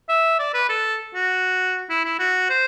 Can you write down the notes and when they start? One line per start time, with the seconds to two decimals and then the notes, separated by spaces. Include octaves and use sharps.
0.09 E5
0.39 D5
0.54 B4
0.69 A4
1.15 F#4
1.90 E4
2.05 E4
2.19 F#4
2.50 C5